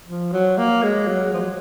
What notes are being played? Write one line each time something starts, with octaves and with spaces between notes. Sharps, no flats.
F3
F#3
A#3
G#3
F#3
F3
F#3